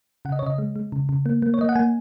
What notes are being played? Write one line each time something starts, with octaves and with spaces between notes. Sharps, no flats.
C#3 F#5
D#5
C#5
C#3 D#5
G#3
G#3
C#3
C#3
A#3
A#3
C#5
A#3 D#5
F#5
A#3 G#5